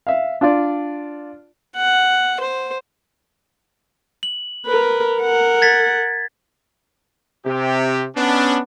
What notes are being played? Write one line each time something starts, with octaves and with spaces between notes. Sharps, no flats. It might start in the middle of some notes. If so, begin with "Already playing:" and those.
E5 F5
D4 F4 D5
F#5
C5
F#7
A#4 B4
A#4 F#5
G#6 A6 B6
C3 G4
B3 C#4 D4